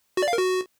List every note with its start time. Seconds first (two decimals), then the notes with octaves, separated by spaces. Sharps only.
0.17 F#4
0.23 D5
0.28 F5
0.33 A#4
0.38 F#4